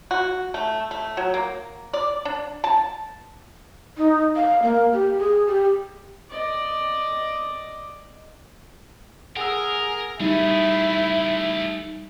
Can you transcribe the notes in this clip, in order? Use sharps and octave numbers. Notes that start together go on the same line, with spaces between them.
F#4
A3
A3
F#3
A#3
D5
D4
A5
D#4
F5
A#3
G4
G#4
G4
D5 D#5
G#4 A#4 F#5 E6
G3 A3 D#4 E4 G#4